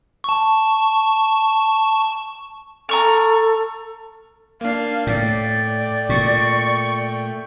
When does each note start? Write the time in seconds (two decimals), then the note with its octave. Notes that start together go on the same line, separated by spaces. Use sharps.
0.24 A5 C#6
2.89 A4 A#5 C#6 F6
4.61 A#3 D4 F5
5.07 A2 A3 D5 G5
6.09 A#2 C#6